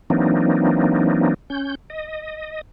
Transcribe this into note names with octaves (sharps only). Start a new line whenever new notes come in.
E3 F#3 A#3 C4 D4 D#4
C#4 G6
D#5